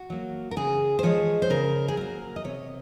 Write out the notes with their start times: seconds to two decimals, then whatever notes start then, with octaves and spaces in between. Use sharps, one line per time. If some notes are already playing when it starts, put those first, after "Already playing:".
Already playing: F#4
0.10 F#3 A#3
0.51 A#4
0.56 C#3 G#4
0.99 C5
1.03 F3 G#3 C#5
1.42 C5
1.50 C#3 A#4
1.88 G#4
1.97 F#3 A#3 A#4
2.36 D#5
2.44 C3 C#5